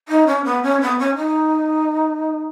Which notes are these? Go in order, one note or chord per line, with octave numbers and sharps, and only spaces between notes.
D#4
C#4
B3
C#4
B3
C#4
D#4